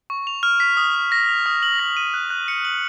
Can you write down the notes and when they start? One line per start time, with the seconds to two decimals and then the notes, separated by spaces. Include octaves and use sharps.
0.10 C#6
0.27 F7
0.43 F6
0.60 B6
0.77 D#6
0.95 D#6
1.12 A#6
1.29 F7
1.46 D#6
1.63 F#7
1.79 A#6
1.97 D#7
2.14 F#6
2.30 F#6
2.48 C#7
2.65 F#7